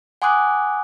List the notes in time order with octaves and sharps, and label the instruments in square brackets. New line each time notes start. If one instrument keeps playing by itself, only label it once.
[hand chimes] F#5 G#5 C6 D6 D#6 F#6